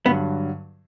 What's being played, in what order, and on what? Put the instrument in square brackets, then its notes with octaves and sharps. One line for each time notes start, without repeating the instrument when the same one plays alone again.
[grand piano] G2 D3 F#3 [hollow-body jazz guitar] B3